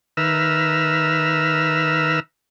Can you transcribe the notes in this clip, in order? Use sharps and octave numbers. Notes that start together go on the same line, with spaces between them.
D#3 B4 E5 A#5 E6 F6